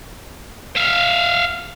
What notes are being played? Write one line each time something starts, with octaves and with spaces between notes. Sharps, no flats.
E5 F5